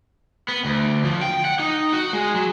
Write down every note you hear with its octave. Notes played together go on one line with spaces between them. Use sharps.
B3
D2
F3
G5
F#5
D#4
F#4
G#3
F#3